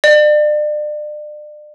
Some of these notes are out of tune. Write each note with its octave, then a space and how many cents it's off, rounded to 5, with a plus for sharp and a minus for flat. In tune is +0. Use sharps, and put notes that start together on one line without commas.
D5 +35